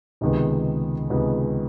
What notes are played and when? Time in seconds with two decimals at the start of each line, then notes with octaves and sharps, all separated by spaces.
0.21 C#2 C3 D#3 G#3 B3
1.10 C#2 C3 D#3 G#3 B3